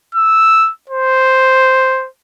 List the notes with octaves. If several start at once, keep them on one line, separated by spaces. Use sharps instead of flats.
E6
C5